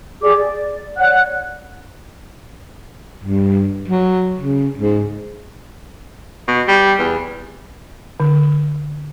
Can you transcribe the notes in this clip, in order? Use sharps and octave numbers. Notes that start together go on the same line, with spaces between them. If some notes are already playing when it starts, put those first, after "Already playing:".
G4 G#4 D5 D6
D5
C#5 D5 F#5 F#6
G2
F#3
C#3
G#2
B2
G3
E2
D3